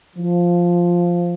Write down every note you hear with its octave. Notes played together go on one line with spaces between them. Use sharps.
F3